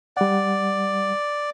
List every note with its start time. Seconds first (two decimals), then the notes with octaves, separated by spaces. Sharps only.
0.17 G3 D5 F#5